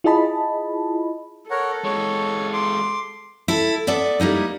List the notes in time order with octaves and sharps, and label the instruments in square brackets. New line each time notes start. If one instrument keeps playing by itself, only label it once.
[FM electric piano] E4 F4 G#4 D#5 A5 B5
[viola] A4 [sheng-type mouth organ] A#4 C#5 F#5
[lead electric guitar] G#3 F#4 [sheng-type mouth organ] C#5
[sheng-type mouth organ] C6 D6
[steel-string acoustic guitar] E4 A4
B3 A4 D5 E5
G3 A#3 D#4 E4